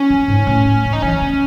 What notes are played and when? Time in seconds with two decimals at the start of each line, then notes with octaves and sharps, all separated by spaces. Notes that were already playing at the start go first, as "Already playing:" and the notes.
Already playing: C#4
0.10 E3
0.28 G#2
0.47 A2
0.65 G#3
0.84 E3
0.93 D#4
1.02 E3 C#4
1.21 B3